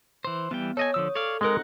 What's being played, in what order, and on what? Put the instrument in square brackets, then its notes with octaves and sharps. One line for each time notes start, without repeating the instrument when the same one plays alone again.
[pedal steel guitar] E3 C5
[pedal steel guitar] E3 G3 G5 [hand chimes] B3
[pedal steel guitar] A4 D#5 G#5 [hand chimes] C#5
[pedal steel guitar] D3 F3 E6 [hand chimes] D#6
[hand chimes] A4 [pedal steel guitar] C#5 D5 F5
[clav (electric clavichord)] G#3 A#4 [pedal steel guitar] C4 D#4 F#5